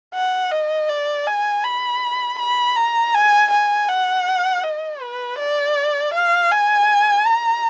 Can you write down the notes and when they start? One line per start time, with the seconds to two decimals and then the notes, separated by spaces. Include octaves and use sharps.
0.14 F#5
0.51 D#5
0.89 D5
1.27 G#5
1.64 B5
2.39 B5
2.76 A#5
3.14 G#5
3.51 G#5
3.88 F#5
4.63 D#5
5.01 B4
5.39 D5
6.14 F5
6.52 G#5
7.26 A#5